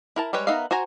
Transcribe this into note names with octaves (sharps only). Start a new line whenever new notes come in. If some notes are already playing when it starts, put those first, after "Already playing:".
E4 A#4 A5
G3 G#3 B4 C#5
B3 D#4 A#4 E5 F5
F#4 C5 G#5 A#5